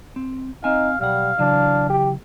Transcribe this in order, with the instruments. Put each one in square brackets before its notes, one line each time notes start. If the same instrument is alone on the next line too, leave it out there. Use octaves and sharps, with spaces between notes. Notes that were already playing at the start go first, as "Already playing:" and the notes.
[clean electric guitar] C4
[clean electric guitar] C4 G#5 [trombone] D#4 [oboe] F5
[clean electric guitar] B1 F#5 [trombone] G3 [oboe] F5
[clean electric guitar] C#3 E3 F#3 [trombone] D4
[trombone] G4